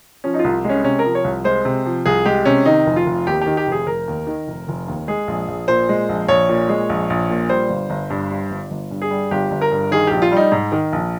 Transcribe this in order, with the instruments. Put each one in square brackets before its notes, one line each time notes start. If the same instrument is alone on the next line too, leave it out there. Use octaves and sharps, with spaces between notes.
[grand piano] F3 C#4
D#4
F4
C2
G#3 C#4
C3 C#4
A#4
F3
C#5
C2
G#3 C5
C3
F3
C2 G#4
G#3 G4
C3 C#4
D#3 D#4
F1
F4
F1
D#2 G4
D#3 G4
G4
F1 G#4
F1 A#4
D#2
D#3
F1
F1
D#2
G#3 G#4
A#1
A#1
A#2 C5
G#3
A#1
A#1 C#5
A#2
G#3
A#1
A#1
A#2
G3 C5
G1
G1
G2
G3
G1
G1
G2
G#4
G3
G1 G4
G1
A#4
G2
D#3 G#4
A#1 G4
F4
G3 D#4
G#2
D#3
A#1